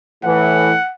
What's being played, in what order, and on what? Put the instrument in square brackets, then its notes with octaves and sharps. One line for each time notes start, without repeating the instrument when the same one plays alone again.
[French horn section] A2 E3 [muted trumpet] F#5